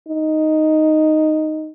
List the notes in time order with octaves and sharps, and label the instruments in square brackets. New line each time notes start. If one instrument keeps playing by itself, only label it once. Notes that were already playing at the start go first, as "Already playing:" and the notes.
[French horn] D#4